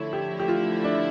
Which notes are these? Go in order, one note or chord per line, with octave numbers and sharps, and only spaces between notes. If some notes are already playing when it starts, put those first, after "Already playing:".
Already playing: D3 F3 A3 E4 C#5
G4
G4
F4
D4